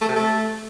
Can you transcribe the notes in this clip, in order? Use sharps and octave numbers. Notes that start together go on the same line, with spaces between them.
A3
C3
A3